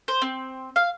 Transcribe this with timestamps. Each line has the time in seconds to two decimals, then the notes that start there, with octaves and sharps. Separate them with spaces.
0.08 C5
0.22 C4
0.76 F5